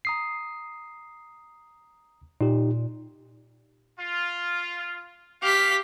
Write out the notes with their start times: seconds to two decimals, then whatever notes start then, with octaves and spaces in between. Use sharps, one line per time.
0.05 A#5 D#6 C7
2.41 A#2 D#4 G4
4.00 F4
5.43 G4 F5 B6